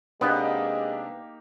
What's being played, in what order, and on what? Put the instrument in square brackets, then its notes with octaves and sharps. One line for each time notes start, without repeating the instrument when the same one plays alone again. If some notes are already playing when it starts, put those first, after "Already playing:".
[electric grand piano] C3 D4 D5 [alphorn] G#3 [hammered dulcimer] A#3 D#4 G4 [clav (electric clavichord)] B3